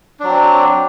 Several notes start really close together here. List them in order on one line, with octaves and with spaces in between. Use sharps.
D4 F#3 C4